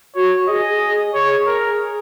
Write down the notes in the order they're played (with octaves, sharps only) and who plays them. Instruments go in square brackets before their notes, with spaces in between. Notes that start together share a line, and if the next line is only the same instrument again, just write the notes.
[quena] F#4 [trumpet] C#5
[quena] G#4 [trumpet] D#5
[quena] G#4 [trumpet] C#5
[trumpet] A#4